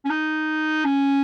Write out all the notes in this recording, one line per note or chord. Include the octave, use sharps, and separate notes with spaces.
C#4
D#4
C#4